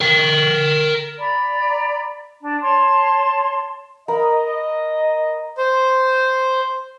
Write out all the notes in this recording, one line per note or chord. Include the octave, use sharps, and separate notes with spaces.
A#4 G5
D5 A#5 B5
D4
C#5 A5 C6
A#4 D#5 B5
C5